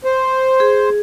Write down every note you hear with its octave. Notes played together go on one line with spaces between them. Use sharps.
C5
G#4